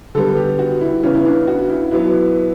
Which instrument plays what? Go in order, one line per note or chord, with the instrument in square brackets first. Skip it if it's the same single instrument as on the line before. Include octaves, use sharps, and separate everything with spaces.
[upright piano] D3 G3 B3 A4
G4
F#4
E4
C#3 E3 B3 C#4
E4
D4
F#4
E4
B2 F#3 B3 E4